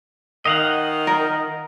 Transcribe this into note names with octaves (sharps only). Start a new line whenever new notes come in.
D#3 D#5 F5 F#5
A#4